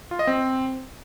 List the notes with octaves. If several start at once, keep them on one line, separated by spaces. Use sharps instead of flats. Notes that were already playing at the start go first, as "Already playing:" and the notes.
F4
D#5
C4